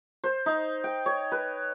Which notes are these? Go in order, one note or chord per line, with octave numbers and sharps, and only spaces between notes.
C5
D#4
G5
C#5
B4